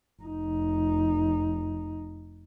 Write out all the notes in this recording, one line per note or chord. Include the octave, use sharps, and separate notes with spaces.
F1 D#4